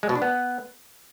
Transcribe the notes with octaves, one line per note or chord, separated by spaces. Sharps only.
G#3
B2
D4
B3